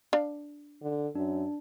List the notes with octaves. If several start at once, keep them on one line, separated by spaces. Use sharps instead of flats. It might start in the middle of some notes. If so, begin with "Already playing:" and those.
D4 F5
D3
F#2 D4